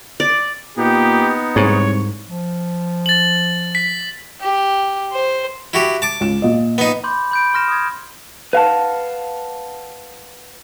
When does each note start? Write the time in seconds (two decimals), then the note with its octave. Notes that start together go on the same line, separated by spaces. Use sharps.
0.20 D5
0.77 A#2 B3 D#4 G4
1.56 C2 G#2 C#5
2.27 F3
3.06 A6 F#7
3.75 B6
4.40 G4
5.12 C5
5.73 E4 F#4 G4
6.02 A5 D6
6.20 C#2 E7
6.42 A#2 D#5
6.78 B3 D#4
7.04 B5 C6 D6 G6
7.31 B5 G6 D7
7.54 C6 F6 A#6 E7
7.68 D#6 G#6
8.53 B4 F5 F#5 A5